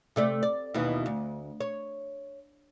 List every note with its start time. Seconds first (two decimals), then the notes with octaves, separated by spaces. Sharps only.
0.16 C3 A3 D5
0.43 D5
0.74 D#2 B2 E3
1.06 D2
1.61 C#5